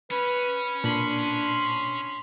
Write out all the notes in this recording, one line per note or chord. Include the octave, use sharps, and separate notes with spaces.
C#4 B4
A#2 D4 B5 C6